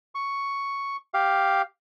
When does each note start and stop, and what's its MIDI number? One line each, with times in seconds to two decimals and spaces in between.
0.15 0.96 85
1.14 1.62 67
1.14 1.62 77